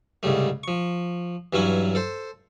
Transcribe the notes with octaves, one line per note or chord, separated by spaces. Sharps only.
C2 G#2 C#3 G3 A3
F3 C#6
G2 E3 F#3 C#4 E4 G#5
A4 C5